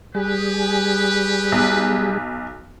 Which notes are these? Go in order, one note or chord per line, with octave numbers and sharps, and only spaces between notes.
G3 G4 G#4 B4
B1